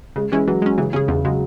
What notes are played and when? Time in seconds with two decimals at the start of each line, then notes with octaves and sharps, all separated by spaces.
0.16 C#3 G#3
0.32 E3 G#3 C#4 E4
0.47 E3 F#3
0.62 G#3 C#4
0.78 C#3 E3
0.93 C#3 C#4 G#4
1.08 E2 C#3
1.24 C#3 F#3 G#3